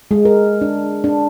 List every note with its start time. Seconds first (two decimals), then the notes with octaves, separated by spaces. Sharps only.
0.11 G#3
0.25 A#4
0.61 D4
1.04 D4